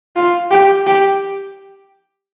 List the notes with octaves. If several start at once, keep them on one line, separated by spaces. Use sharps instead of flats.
F4
G4
G4